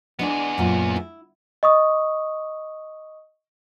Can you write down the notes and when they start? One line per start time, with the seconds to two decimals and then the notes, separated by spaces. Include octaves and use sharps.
0.19 G#3 B3 D4 G#4 D5
0.58 F#2 A#2
0.96 E4
1.63 D#5 C#6 D#6